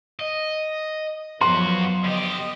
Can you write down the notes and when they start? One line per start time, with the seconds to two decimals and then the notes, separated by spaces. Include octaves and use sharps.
0.19 D#5
1.41 F#2 F3 F#3 B3 F#4 C6
2.04 D3 G4 D#5